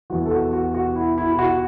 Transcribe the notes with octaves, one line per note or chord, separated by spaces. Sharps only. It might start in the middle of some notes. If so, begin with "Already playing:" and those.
E2 E3 F#4
A4
F#4
F#4
F#4
E4
E4
E4
F#4